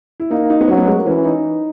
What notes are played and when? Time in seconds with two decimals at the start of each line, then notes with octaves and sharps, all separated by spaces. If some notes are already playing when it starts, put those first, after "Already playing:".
0.20 E4
0.30 A#3 D#4
0.50 D#4
0.61 B3
0.68 F#3 C#4
0.78 B3
0.87 G#3
0.97 A#3
1.06 E3 C#4
1.25 D#4